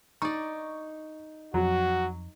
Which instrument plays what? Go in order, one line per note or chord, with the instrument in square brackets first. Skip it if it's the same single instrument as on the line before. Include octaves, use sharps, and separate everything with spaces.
[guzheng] D#4 D5 [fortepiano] C#6
[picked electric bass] F2 [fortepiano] F#3 [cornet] F#4